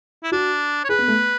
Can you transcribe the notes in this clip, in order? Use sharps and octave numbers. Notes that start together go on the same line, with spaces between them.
E4
D4 F#4
C#5
G#4 B4
B3
A3